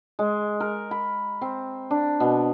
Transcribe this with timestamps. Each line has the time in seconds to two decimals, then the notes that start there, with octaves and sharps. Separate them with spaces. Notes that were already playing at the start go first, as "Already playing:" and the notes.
0.19 G#3
0.60 A#4
0.91 B5
1.41 C4
1.91 D4
2.20 B2